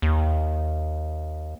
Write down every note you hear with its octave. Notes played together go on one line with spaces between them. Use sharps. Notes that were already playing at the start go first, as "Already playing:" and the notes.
D#2